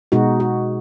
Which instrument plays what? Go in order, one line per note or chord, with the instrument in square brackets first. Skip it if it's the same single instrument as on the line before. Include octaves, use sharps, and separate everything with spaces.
[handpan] B2 G#3 D#4 F#4
F#4